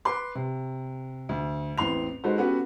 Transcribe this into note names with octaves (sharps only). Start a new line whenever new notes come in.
B4 C6 D6
C3
D2
A1 E2 C4 C6 F7
G#3 D#4 F#4 A4 B4 C5
B3 C#4 F#4 G4 A4 B4